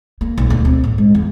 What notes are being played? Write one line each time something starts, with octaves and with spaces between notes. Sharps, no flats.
A#3
B1
D2
C4
A2
G#3
E2